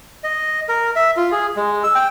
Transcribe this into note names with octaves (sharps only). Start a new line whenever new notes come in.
D#5
A#4
E5
F4
G#4
G#3
E6
G5